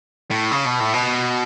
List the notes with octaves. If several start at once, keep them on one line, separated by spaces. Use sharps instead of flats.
A2
C#3
B2
A2
B2